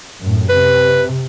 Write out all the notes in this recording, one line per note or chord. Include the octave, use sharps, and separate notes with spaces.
F#2 A2
C3 B4